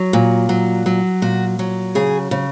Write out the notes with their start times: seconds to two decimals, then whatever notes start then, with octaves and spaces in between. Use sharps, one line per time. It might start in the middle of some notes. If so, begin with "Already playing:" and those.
Already playing: F#3
0.13 A#2
0.49 F#3
0.86 F#3
1.22 A#2 F#4
1.59 F#3
1.95 C#3 G#4
2.31 C#3